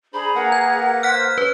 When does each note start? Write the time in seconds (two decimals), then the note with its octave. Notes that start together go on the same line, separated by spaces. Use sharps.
0.14 D4 G#4 C5 A#5 B5
0.35 A#3 A#4 B4 F#5
0.52 G#6
1.03 C5 F6 F#6 B6
1.38 C#4 B4